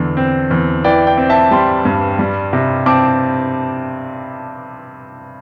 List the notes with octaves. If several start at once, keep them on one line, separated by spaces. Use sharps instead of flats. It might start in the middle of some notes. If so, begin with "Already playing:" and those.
Already playing: E2 D3
C4
E2
E3 D5 G5
D5 G5
C4
E5 A5
G3 G5 C6
G2
G3
C3
C4 A5 D6